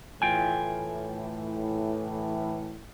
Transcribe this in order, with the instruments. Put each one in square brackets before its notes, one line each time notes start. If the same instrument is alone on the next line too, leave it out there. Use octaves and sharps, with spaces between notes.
[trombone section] A2 E3 [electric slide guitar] F4 G5 G#5